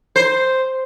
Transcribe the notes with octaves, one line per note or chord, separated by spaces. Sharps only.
C5